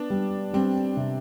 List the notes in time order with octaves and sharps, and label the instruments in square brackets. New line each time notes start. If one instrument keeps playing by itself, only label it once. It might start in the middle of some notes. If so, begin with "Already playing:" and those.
Already playing: [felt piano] B3 [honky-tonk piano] D4
[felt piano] G3
[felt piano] G3 [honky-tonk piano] C4
[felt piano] C3